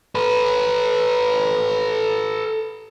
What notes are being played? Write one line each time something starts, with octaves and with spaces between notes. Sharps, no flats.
A4 B4